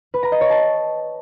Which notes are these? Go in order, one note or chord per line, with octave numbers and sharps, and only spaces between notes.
B4
A#5
D#5
C#5
A5